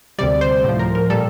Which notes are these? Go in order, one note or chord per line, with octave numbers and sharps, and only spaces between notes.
D2 C3 G3 D5
C5
A2 F3
A#4
A#4
A#2 G3 A4